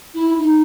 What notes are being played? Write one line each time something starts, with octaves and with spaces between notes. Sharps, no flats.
E4
D#4